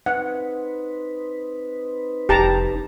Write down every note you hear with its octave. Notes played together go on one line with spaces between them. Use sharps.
C4 D#4 B4 F#5
F1 G4 A5 A#5